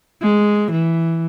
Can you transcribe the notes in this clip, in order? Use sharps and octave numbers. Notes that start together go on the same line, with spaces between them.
G#3
E3